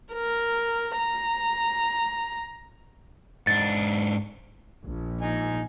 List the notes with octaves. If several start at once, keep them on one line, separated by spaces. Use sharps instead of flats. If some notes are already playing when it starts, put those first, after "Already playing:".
A#4
A#5
G#2 D4 A6
A#1
D#4 G#5